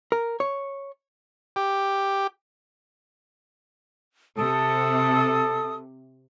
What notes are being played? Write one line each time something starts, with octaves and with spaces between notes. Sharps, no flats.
A#4
C#5
G4
C3 A4 D#6